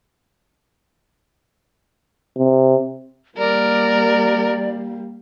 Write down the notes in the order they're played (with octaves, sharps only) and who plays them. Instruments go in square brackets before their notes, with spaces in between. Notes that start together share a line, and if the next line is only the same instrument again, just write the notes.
[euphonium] C3
[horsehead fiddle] G3 A#3 [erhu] A#4 [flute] D5